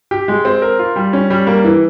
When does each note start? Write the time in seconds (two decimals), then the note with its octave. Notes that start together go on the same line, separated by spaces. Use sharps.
0.11 G4
0.28 G#3
0.45 C4
0.62 A#4
0.79 F4
0.96 G3
1.13 C#4
1.30 G3
1.47 A#3
1.64 E3